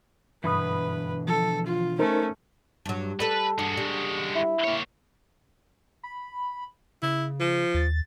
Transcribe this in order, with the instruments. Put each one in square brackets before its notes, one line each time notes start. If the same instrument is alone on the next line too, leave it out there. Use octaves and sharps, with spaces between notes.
[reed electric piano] G2 B5 D#6 [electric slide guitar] B2 D3 E3 [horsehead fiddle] B4
[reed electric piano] F3 [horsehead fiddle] A4
[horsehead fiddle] F4
[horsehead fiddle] A3 C#4 [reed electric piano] D#4 A#4 C5
[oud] G2 F#3
[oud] G3 A4 [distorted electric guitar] B4
[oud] G2 [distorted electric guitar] G#3 F#4
[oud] G3
[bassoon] E4
[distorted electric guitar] A#3 C#5
[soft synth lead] B5
[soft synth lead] C#3 [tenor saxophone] E4
[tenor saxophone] F3
[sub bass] D#2 [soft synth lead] A6